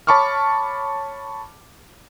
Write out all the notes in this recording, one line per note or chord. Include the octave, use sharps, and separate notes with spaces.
C#5 A5 B5 C#6 D6 F6